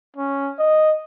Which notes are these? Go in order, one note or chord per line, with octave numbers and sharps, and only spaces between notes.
C#4
D#5